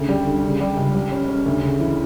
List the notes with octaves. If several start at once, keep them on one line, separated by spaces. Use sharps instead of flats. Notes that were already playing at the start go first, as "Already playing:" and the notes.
Already playing: D2 C#3
G3
D3
C#3
G3
C#2
G3
C#4
C#4
D2
C#3
E3